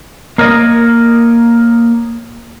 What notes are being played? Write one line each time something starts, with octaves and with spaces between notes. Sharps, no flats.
A#3 A#4 C#5 D#5